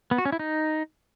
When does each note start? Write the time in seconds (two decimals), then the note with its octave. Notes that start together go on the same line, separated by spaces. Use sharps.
0.11 B3
0.18 F#4
0.25 C#4
0.32 E4
0.39 D#4